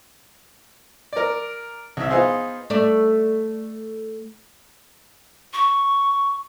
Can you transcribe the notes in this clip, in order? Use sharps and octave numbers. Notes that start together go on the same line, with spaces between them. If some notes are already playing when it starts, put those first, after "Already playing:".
A#4 D5
C2 E5
B3 D#4 F4 G#4 C5
A3 D5
C#6